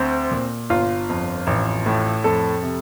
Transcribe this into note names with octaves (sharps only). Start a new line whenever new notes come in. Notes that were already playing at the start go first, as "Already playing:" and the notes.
Already playing: D2 C4
A#2
G1 F4
F2
A1
A2
F2 A4
C3